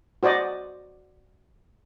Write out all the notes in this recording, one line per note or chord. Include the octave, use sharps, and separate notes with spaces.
F#4 C5 D5 D#5